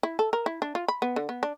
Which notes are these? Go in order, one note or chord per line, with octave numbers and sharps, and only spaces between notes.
E4
A4
A#4
E4
D4
F4
B5
B3
D3
B3
D4